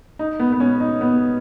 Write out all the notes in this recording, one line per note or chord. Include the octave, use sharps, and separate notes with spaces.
D#4
B3
B3
C#4
D#4
B3